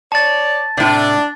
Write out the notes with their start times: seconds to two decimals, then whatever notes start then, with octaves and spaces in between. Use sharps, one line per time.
0.12 C#5 D5 A5 A6
0.77 A2 C3 D4